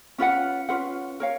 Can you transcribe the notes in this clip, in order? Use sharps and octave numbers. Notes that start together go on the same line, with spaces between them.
C#4 F4 B4 F#5
C#4 F4 B4 F#5
A#4 C#5 F5